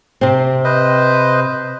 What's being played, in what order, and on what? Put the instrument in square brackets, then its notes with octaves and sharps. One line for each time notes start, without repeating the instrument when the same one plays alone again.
[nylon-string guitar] C3 C4
[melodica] B4 C5 D#5